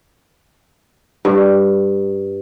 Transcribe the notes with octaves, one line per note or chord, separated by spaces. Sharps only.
G2